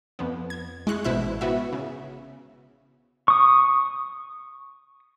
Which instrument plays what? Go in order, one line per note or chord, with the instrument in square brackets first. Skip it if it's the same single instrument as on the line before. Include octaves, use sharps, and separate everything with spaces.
[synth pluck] F2 F3 B3
G#6
G#3 E4 C#6 F#6
A1 B2 E4 C5 E5 F#6
B3 E4 F#4 E5
C#3
[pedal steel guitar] C#6 D#6